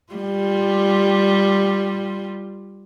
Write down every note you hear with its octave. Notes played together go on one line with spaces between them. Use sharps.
G3 F4